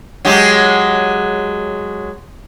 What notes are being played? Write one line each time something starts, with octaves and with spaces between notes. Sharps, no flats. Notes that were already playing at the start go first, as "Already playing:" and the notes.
F#3 G#3 G4